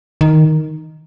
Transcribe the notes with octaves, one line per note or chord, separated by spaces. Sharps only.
D#3